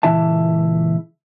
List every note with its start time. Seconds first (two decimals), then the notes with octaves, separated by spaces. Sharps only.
0.03 C#2 A#2 E3 E4 E5 A5